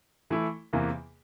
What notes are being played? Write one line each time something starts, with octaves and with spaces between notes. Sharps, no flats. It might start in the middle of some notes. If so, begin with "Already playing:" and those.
E3 A3 E4 A4
E2 C3 E3 A#3